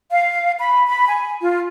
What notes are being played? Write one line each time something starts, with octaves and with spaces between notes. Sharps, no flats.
F5
B5
B5
G#5
F4